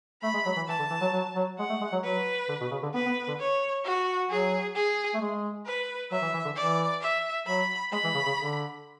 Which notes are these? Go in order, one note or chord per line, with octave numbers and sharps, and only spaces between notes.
A3 B5
G#3
F#3
E3
E3 A5
D3
E3
F#3
F#3
F#3
G#3 F#5
A3
G#3
F#3
F#3 B4
D3
B2
C#3
D3
B3 B4
B3
D3
C#5
F#4
F#3 G#4
G#4
A3
G#3
B4
F#3 E5
E3
E3
D3
E3 D5
E5
F#3 B5
G#3 B5
E3
C#3
C#3
D3